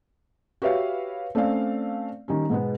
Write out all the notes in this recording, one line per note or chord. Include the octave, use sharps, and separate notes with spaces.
F#4 G4 B4 C#5 E5 F5
A3 C4 C#4 D5 F5
D#3 G3 C#4
G#2 B2 G#3 B3